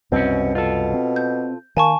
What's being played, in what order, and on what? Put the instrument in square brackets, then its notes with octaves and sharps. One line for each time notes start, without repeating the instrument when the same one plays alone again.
[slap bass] C2 F#2 [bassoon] B2 [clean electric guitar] C4 C#4
[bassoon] B2 [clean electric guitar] F4 A4
[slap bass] C4
[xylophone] G6
[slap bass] D#3 [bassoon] A#3 [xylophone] G#5 A5 C#6